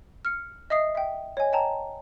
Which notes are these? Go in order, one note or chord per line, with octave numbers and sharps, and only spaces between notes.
F6 C#7
D#5 E5 D#6 C7
E5 G5
C#5 D#5 G#5
D#5 G5 A5 A#5